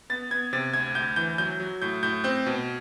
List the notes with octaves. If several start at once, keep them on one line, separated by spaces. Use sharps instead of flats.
B3 A6
B3 G#6
C3 A6
D2 G#6
D2 G6
E3 G6
F#3 G6
F#3
A2 G6
A2 G6
C4 G6
B2